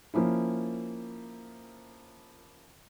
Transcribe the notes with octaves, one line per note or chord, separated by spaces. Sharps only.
F3 A#3 C#4 E4